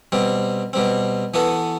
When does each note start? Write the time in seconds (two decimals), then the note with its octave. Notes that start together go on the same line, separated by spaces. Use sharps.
0.12 B2 G3 C4
0.73 B2 G3 C4
1.34 E3 B3 F#4 A4